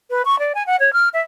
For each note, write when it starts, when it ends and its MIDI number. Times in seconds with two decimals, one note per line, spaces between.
0.10 0.22 71
0.25 0.39 85
0.39 0.52 74
0.55 0.63 80
0.66 0.76 78
0.80 0.92 73
0.93 1.09 89
1.13 1.21 76